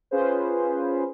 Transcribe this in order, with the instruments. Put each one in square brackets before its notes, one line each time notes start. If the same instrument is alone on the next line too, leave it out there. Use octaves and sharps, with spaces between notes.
[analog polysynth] C#4 F4 G#4 B4 C5